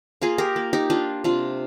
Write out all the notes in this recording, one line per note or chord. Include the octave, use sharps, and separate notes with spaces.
A#3 F4 G#4
G4 A#4
A#3
D#4 G4
A#3 D4 F4
C3 D4 F4